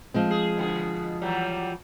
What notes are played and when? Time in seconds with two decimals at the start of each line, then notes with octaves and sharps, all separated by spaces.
0.14 F3 G#3 C4
0.31 G#4
0.57 B2 D3 G#4
1.22 E3 F#3 G3